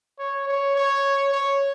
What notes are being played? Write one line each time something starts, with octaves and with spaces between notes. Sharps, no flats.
C#5
C#5
C#5
C#5